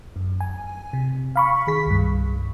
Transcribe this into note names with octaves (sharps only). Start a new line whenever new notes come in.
F#2
G#5
C3
F5 B5 C#6
D#3 G#4 B6
C2 G2